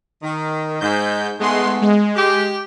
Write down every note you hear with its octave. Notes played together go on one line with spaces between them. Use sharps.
D#3
G#2 G6
G#2 G#3 A3 B3 C6
G#3
G4